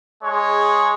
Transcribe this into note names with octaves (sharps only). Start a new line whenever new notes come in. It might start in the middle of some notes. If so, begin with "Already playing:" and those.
G#3 G#4 C#5